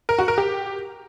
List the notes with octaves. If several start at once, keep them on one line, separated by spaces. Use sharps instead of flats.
A#4
F#4
A#4
G4